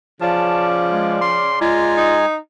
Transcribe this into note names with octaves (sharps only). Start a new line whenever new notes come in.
C#3 F3 C#4 D5 A5
G#3
C6
G#3 F4 G#5 A#5
D#4